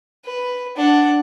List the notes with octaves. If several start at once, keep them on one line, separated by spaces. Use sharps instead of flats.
B4
D4 F#5